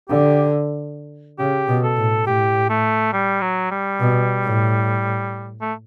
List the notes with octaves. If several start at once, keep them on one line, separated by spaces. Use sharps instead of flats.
D3 G4
C#3 G4
B2
A4
A2
A2 G4
A3
G3
F#3
G3
B2
A2
A3